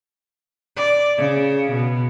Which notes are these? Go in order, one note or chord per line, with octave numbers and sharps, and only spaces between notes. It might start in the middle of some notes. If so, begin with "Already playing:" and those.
D5
C#3
B2